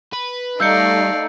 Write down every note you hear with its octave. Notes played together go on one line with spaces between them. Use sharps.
B4
G3 A3 D#4 D5 F5 E6 G6 C#7